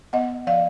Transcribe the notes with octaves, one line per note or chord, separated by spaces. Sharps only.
B3 D#5 F#5
F3 D5 F5